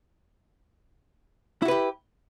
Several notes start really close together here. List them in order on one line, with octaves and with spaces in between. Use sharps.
E4 F#4 B4 G4